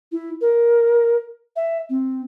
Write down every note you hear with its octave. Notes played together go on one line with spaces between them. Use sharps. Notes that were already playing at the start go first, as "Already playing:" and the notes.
E4
A#4
E5
C4